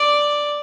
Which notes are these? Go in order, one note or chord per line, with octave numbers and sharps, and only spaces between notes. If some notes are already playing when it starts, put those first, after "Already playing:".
Already playing: D5